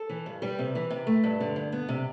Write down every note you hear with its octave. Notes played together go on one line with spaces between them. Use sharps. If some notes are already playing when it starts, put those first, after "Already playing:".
Already playing: A4
E3
G2
G3 B4
C3
E3
C3
A3
G2
D3
G2
B3
C3